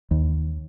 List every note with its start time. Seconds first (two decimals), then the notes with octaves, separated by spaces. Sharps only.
0.11 D#2